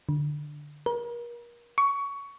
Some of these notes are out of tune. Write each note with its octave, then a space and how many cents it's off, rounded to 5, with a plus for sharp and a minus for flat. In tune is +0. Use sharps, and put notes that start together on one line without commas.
D3 +10
A#4 +35
C#6 +15